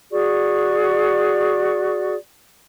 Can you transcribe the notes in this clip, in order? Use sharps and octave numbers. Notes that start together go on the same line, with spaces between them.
F#4 G#4 D5 C#6